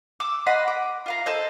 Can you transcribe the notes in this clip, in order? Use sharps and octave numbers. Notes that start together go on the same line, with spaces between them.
D6 E6
D#5 F#5 B5 C6
D6
F4 F5 A#5
A4 C5 D#5